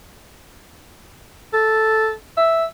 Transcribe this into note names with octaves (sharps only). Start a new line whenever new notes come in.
A4
E5